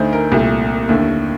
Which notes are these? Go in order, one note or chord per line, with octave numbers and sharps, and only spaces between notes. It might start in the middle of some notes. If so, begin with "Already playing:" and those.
Already playing: D2 D3 A3 D#4 C5
A#4
C2 A#2 A3
D#2 D3 A3